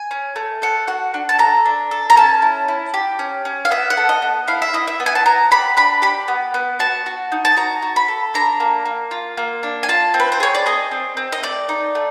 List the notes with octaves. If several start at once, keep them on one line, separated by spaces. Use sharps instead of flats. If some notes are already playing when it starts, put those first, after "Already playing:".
Already playing: G#5
C#4
A3
A4 F#5
F#4 F#5
D4
A5
A4 A#5
D4
A4
A#5
C#4 A5
E4
E4
G4
C#4
C#4
F5
B3 E5
F#5
A4
D#5
B3
E4 F5
E5
E4 D#5
E5
B3
G#5
A5
B3 A#5
G4 B5
D4 B5
G4 B5
B3
B3
F#4 A5
F#4
D#4
A5
F#4 A#5
F#4
B5
A4
D4 A#5
A#3
A#3
F4
A#3
D4
G#5
F4 A5
C4
B4
C5
G#4 C#5
D5
G#4 D#5
C4
C4
D#5
A3 D5
D#4
A3